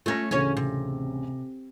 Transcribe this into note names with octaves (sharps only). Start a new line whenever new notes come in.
A3 C#4 F4 A#6
A1 D2 C#3 C#4 C#5
C3